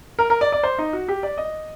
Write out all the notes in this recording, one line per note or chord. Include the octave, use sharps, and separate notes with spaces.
A#4
A#4
D5
D5
C5
D#4
F#4
G4
D5
D#5